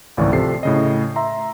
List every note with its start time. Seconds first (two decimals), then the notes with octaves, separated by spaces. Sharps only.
0.17 G#1 C#2 A2 E3 D5 C#6
0.32 C3 F3 A4 C7
0.63 A2 C#3 D#5
1.16 E5 A#5 C6